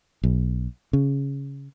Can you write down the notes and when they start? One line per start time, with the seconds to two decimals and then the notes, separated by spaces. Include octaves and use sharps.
0.23 B1
0.93 C#3